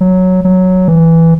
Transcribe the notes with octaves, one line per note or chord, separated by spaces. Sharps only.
F#3
F#3
E3